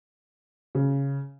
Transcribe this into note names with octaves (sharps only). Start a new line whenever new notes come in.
C#3